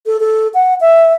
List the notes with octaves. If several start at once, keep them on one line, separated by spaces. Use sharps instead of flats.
A4
A4
F#5
E5